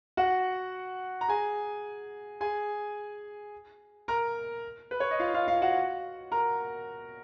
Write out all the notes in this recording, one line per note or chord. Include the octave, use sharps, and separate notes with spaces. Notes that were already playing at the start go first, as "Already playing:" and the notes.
F#4 F#5
A#5
G#4 G#5
G#4 G#5
A#4 A#5
B4
C#5
D#5
F4 F5
F4 F5
F4 F5
F#4 F#5
A#4 A#5